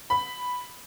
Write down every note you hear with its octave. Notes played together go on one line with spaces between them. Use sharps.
B5